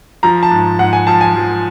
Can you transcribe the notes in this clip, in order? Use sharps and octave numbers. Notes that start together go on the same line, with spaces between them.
F3 A#5
A5
G#2
G#2 F#5
G#5
F3 A5
G#5
F3